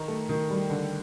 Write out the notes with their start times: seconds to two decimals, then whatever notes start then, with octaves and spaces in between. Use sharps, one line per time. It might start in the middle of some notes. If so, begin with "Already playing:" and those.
Already playing: D#3 A#5
0.08 A3
0.29 D#3
0.50 G3
0.70 D3